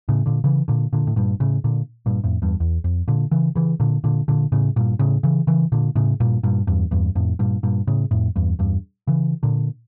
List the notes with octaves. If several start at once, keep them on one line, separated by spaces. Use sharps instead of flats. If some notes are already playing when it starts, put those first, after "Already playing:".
A2 C#3
A#2 D3
C#3 E3
A#2 D3
A#2 D3
A2
G2 A#2
A2 C#3
A#2 D3
G2 A#2
F2 A2
E2 G2
E2
F2
A#2 D3
C#3 E3
C#3 E3
A#2 D3
A#2 D3
A#2 D3
A2 C#3
G2 A#2
A2 C#3
C#3 E3
C#3 E3
A#2 D3
A2 C#3
G2 A#2
G2 A#2
E2 G2
E2 G2
F2 A2
G2 A#2
G2 A#2
A2 C#3
F2 A2
E2 G2
E2 G2
C#3 E3
A#2 D3